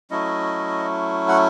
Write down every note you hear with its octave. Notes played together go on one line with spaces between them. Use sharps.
F#3 A3 C#4 E4 D#5
F#5